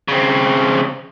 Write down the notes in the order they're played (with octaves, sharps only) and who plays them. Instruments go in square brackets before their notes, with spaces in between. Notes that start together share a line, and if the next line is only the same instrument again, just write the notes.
[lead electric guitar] C#3 C4